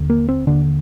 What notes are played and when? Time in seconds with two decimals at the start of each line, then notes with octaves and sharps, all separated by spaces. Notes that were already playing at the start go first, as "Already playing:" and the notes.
Already playing: D#2 D3
0.10 A#3
0.29 C4
0.47 D#2 D3 D4